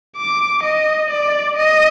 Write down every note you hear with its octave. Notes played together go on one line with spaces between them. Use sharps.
D6
D#5
D5
D#5